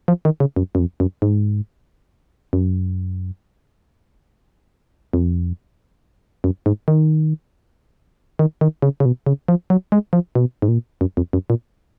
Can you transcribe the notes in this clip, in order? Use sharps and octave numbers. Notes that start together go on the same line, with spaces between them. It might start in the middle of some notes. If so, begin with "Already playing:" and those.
F3
D#3
C#3
F#2
F#2
F2
F#2
G#2
F#2
F2
F#2
G#2
D#3
D#3
D#3
C#3
C#3
B2
C#3
F3
F#3
G#3
F3
B2
G#2
A#2
F#2
F2
F#2
A#2